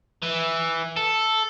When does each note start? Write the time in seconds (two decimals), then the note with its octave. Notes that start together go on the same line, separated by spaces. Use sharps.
0.22 E3
0.97 A4